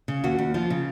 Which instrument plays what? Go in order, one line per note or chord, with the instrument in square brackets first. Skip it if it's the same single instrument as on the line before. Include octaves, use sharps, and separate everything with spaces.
[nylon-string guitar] C#3
D#2 F#4
D#2
F3 F4
C#3